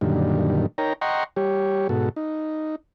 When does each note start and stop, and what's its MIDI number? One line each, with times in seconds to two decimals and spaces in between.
0.01 0.66 42
0.01 0.66 46
0.01 0.66 50
0.01 0.66 51
0.01 0.66 55
0.78 0.93 63
0.78 0.93 70
0.78 0.93 73
0.78 0.93 79
0.78 0.93 82
1.01 1.24 75
1.01 1.24 78
1.01 1.24 79
1.01 1.24 82
1.01 1.24 84
1.01 1.24 85
1.36 1.88 55
1.36 1.88 67
1.36 1.88 73
1.89 2.09 44
1.89 2.09 47
1.89 2.09 66
1.89 2.09 69
2.16 2.76 63